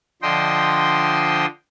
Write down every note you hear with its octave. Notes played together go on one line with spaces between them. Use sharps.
D3 F3 C5 D#5 G5 C6